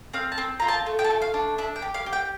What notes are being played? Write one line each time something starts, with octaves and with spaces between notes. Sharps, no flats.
C4 F5
A5
C4
F4 A#5
A5
A3
G5
A5
A3
F5
D4
D4 E5
G5
G4
F5
G4
G5